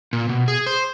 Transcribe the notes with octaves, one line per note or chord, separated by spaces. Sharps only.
A#2
B2
G#4
C5